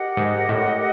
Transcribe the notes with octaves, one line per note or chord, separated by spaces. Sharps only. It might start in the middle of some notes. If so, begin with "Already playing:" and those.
Already playing: G4 A#4 D#5 F#5
G#2
A2